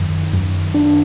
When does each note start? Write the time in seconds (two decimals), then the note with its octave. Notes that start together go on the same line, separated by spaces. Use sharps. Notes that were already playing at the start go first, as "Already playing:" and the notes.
Already playing: F#2 D#3
0.33 F#2
0.74 D4